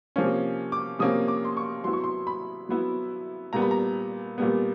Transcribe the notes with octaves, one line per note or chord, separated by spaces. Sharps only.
C3 F3 A#3 C#4
D6
C3 F3 A#3 C#4 D#6
D6
C6
C#6
F#3 B3 E4 C6
C#6
C6
B5
F#3 B3 E4
A#2 G3 B3 A#5
B5
A#5
A#2 G3 B3